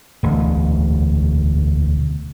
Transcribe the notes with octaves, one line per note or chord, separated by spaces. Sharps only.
E1 D2